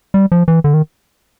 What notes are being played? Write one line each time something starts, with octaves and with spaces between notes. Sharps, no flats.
G3
F3
E3
D3
D#3